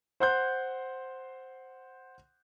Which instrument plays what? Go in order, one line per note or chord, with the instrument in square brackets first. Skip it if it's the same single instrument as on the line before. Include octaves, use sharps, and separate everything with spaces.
[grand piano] C5 F#5 C6 F#6 G6